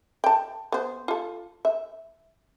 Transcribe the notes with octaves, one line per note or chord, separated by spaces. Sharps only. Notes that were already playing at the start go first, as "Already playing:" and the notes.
G5 A5
B3 C5
F4 A4
E5